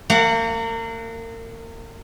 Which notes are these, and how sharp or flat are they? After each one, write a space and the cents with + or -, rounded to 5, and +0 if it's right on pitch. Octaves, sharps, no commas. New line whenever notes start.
A#3 -35 F#5 +0